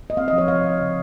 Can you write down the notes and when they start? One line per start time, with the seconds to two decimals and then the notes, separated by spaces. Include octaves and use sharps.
0.10 D#5
0.17 C4 F5
0.28 D#5
0.33 F3
0.38 C#5
0.48 F3 F5
0.64 F3
0.79 C#3